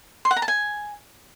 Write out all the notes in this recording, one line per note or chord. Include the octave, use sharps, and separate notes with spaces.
C6
F#5
A#5
A5
G#5